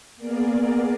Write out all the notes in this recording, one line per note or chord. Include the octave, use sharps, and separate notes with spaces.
A#3 B3 G#4 A#4 D5